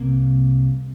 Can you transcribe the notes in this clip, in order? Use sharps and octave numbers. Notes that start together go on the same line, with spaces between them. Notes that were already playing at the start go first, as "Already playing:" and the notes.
Already playing: C2 C3 A#3